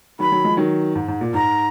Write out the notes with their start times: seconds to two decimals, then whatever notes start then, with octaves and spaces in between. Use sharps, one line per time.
0.19 D#3 F#3 B5
0.32 D#3 F#3
0.44 F3 G#3
0.57 D#3 F#3
0.95 G#2
1.08 G#2
1.21 A#2
1.34 G#2 A#5